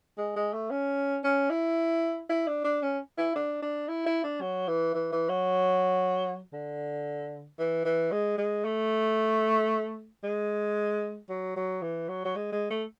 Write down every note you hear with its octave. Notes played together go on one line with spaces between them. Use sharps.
G#3
G#3
A3
C#4
C#4
E4
E4
D4
D4
C#4
E4
D4
D4
E4
E4
D4
F#3
E3
E3
E3
F#3
D3
E3
E3
G#3
G#3
A3
G#3
F#3
F#3
E3
F#3
F#3
G#3
G#3
A3